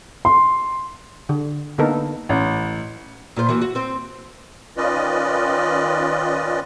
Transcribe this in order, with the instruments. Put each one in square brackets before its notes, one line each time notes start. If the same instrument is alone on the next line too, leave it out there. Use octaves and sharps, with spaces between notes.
[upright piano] C6
[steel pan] D3
D3 A#3 B3 D#4 A4 A#4
[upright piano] A1
[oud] A#2 F4 C5
E3 A#3 F#4
F#4
C4 C5
[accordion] D#3 C#4 F4 B4 D5 D#5